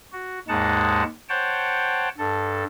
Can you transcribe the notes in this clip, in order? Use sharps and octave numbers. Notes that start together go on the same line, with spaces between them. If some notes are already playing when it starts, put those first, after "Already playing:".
F#4
D#2 G#2 G#3 D#4 F#5 A5
C5 C#5 F#5 G5 A5
G2 A4